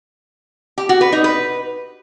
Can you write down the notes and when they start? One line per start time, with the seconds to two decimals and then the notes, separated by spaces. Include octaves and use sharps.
0.78 G4
0.89 F#4
1.01 B4
1.12 D#4
1.24 B4